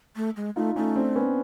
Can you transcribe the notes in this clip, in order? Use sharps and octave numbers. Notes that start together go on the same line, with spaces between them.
A3
G#3
A3 D#4 F4
A3 C#4 D#4
C4 D4
B3 C#4